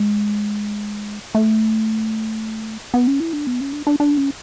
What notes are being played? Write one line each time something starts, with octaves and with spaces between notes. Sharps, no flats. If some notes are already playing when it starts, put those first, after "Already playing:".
Already playing: G#3
A3
B3
C#4
E4
D4
B3
C#4
D4
D4
D4
C#4